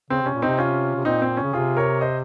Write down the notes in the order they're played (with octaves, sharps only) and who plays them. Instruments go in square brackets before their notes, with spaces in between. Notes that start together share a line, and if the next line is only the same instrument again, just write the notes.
[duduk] C#3 [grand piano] C4
[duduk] C3 [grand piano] C#4
[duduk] A#2
[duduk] C3 [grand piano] C4 D#4
[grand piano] C#4 F4
[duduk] C3
[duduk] A#2 [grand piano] C4 D#4
[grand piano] C4
C#4
[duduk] C#3
[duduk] C3 [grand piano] F4 G#4
[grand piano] A#4 C#5
C5 D#5